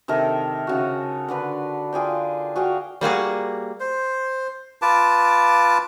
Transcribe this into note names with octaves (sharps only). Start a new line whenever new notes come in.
C3 D#3 A4 A#4
C#3 F#4
D3 D4 B4
F4 G#4 D5 G5
F#4 G#4 F5 G5
G3 A#3 F#4 G#4
C5
F4 B4 A5 D6